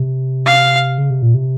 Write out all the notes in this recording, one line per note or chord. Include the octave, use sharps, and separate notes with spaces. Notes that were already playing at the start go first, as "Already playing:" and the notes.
Already playing: C3
F5
C#3
C3
A#2
C3